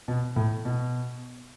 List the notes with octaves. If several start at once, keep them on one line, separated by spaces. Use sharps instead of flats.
B2
A2
B2